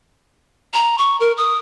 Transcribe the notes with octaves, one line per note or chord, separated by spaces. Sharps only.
A#5
C#6
A#4
D#6